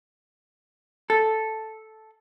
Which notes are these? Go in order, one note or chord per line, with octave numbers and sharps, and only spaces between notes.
A4